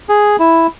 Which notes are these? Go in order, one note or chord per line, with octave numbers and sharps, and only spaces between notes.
G#4
E4